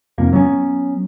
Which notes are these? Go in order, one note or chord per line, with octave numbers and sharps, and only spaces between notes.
F1 F2 A#3
F#3 B3 C#4